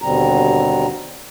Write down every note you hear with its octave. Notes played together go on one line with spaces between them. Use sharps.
D#2 B2 D3 G3 C4 A#5